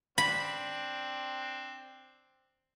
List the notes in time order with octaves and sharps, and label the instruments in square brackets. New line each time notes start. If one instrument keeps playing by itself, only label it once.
[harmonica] C4 D4 [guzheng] B5